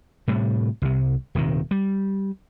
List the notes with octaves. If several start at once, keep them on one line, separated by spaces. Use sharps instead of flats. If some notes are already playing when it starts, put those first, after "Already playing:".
A2 C3 G3
C2 C3
D#1 C3 D#3
G3